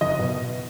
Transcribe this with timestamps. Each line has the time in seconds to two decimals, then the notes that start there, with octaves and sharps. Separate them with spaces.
0.01 F#1 D#5
0.19 B2